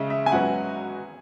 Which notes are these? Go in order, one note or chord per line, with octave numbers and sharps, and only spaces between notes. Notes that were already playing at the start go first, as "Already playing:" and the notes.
Already playing: C#3 G#3 C#4 G#4 E5
E5
G#5
G#2 F#3 C#4 F#4 B4 F#5